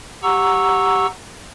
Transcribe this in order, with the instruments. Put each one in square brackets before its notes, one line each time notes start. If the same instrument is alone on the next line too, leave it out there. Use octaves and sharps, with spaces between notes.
[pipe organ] G4 F#5 A#5 C#6 E6